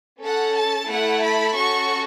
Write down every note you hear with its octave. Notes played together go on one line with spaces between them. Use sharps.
C#4 A4 F#5
A5
A3 E4 A4 F#5
B5
C#4 F#4 A4 C#6